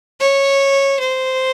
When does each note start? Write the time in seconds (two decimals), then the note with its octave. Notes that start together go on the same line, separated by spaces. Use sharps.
0.20 C#5
1.00 C5